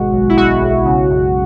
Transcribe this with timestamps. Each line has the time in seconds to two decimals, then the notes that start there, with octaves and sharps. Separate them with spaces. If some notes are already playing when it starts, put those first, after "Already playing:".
Already playing: G#1 B2 G#3 F#4
0.12 B1
0.29 E4
0.37 G#3 F#4
0.61 B1
0.85 C#3
1.10 F#2